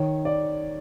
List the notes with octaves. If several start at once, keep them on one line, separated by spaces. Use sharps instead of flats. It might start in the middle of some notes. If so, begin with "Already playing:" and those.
Already playing: D#3 C#5
D5